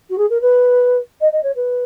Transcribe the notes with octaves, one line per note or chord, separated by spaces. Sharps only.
F#4
G#4
A#4
B4
D#5
D#5
C#5
B4